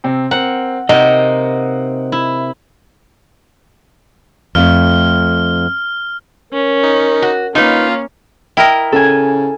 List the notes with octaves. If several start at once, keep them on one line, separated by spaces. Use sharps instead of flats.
C3 C4
C4 A#4 F#5
C3 A#3 D#4 D#5 F#5
E4
F2 A3 F6
C#4 A#4
D#4
F#4
A#3 C#4 D#4 F4 B4 F5
E4 A#4 D#5 G5
C#3 A4 G#5